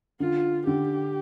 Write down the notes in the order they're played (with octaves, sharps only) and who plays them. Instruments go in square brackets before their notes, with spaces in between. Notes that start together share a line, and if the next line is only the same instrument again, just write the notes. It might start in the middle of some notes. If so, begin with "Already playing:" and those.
[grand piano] D3 [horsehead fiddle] F4
[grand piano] D3 [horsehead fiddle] G4